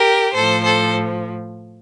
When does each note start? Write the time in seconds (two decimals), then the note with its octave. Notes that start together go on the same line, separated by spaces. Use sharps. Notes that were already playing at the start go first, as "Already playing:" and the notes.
Already playing: G4 A#4
0.34 A2 F3 A4 C5
0.64 A4 C5